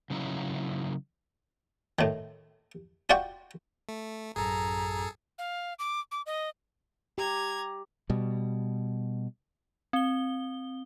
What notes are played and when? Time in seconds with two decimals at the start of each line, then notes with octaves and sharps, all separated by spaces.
0.10 C#3 F#3 D#4 E4
1.99 A2 D#3
3.10 F4 F#4 D5 F#5 G5
3.89 A3
4.36 A1 F#2 G#4 A4 A#5
5.39 F5
5.79 D6
6.12 D6
6.26 D#5
7.18 G4 A#5 G#6
8.10 B2 G3
9.93 C4 G7